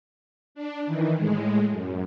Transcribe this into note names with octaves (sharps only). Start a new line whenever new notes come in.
D4
D#3 E3
A2 G#3
F#2